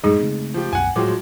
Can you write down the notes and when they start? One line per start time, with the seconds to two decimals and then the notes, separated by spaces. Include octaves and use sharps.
0.04 F#2 A2 G3 G#3 D#4 G#4
0.19 C#3 A3 C4
0.54 F3 G4
0.73 C2 F#2 F#5 G#5
0.96 A2 F3 F#3 G#3 G5 D6